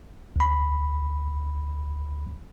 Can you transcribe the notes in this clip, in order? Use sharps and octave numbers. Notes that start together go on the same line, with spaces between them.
D2 B5